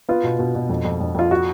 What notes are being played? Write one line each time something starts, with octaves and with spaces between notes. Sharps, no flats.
B3 F4
B2
B2
B2
F2
F2
F2
F2 F4
F#4